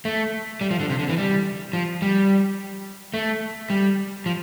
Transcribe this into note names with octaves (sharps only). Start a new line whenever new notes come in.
A3
G3
F3
D3
C3
D3
E3
G3
F3
G3
A3
G3
F3